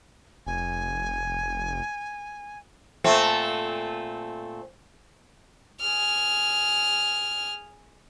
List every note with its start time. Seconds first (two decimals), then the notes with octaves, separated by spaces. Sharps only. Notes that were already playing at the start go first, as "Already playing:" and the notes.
0.47 F1 G#5
3.04 A#2 A3 C4
5.80 G#4 F6